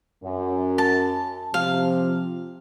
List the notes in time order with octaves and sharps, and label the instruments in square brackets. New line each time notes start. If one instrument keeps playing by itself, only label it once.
[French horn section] F#2
[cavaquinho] A5
[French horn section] C3 F3 [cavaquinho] F5